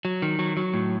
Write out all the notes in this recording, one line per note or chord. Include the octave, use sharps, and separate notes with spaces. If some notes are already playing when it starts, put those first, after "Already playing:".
F#3
D#3
F#3
F#3
A2